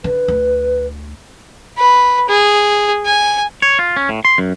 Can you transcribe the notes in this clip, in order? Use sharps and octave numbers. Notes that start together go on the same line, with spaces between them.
D3 B4
D2
B4
G#4
G#5
C#5
F4
C#4
A2
C6
F#2